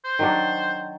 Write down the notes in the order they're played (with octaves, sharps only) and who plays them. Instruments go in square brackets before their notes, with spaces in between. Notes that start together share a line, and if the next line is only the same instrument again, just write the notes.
[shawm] C5
[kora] D#3 F#3 D4